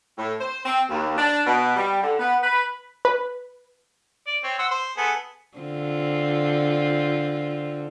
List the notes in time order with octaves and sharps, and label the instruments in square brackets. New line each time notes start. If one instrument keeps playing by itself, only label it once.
[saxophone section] A2
C5
C4
D#2
D4
B2
G3
D3
B3
B4
[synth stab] B4
[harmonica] D5
C4 C#5
C5 F#5 E6
C5
B3 G#4 A4
[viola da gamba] D3 C4 F4